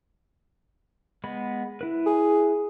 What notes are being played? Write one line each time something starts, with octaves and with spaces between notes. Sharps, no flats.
G#3 B3 B5
E4 B4
G#4